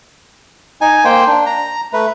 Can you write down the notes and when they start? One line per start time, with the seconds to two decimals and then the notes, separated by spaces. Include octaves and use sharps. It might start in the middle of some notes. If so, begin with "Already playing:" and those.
0.81 D#4 G#5
1.04 A#3 C5 G5
1.27 D4
1.46 A#5
1.93 A3 B4